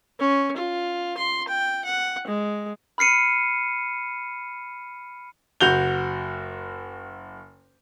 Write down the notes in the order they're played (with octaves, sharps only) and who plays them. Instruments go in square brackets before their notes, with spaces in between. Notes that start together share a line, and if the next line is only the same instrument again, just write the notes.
[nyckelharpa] C#4
F4
C6
G5
F#5
G#3
[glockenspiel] B5 F6 C7 C#7 D#7
[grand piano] F#1 F#4 G6 F7 G7